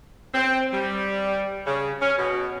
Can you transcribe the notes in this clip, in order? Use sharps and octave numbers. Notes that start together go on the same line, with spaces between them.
C4
G3
C#3
C#4
B2